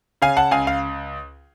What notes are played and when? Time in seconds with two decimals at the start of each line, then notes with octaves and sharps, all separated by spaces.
0.22 C#3 F5 G#5
0.37 F#5 A5
0.51 C#2 F5 G#5
0.67 F5